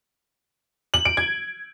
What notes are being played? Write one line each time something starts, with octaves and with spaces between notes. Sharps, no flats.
F#7
D7
G#6